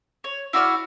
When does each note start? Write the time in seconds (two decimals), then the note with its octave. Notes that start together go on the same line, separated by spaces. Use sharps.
0.24 C#5
0.53 E4 F#4 D5 F6